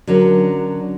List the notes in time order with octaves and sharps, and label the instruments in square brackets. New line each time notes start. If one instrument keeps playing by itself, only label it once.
[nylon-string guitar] D3 F#3 C#4 D4 A#4